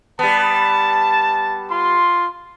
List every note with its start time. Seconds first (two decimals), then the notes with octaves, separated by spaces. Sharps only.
0.19 G3 B3 A5
1.70 F4 C6